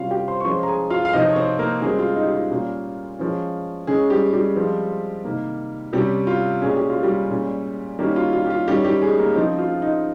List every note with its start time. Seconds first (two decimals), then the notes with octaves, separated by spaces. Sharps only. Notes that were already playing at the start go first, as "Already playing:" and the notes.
Already playing: C3 G3 C#4 F4 F5
0.11 G4 G5
0.28 C5 C6
0.40 C#6
0.45 F3 G#3 C#4 C5 C6
0.63 A#5
0.68 G#4 G#5
0.90 F4 F5
1.05 F5
1.13 C3 F3 C4 D#4 D#5
1.29 C#5
1.36 C4 C5
1.59 A#3 A#4
1.82 C#3 G3 G#3 C4 G#4
1.99 F4
2.16 D#4
2.27 G4
2.33 F4
2.51 A#2 G3 A#3 C#4
3.19 F3 G#3 C#4
3.87 C#3 G#3 C#4 G#4
4.10 G3 G4
4.33 G3 G4
4.56 F3 G#3 C4
5.25 C3 D#3 A#3
5.93 C3 G3 C#4 G4
6.27 F4
6.62 A#2 G#3 C#4 G#4
6.76 G4
6.90 F4
7.03 G3 G4
7.31 A#2 G#3 C#4
7.99 D#3 G3 A#3 C#4 G4
8.16 F4
8.33 F4
8.46 G4
8.50 F4
8.68 D#3 G3 C#4 G4
8.84 G3 G4
9.02 G#3 G#4
9.19 A#3 A#4
9.36 C#3 F3 C4 D#4
9.59 F4
9.82 D#4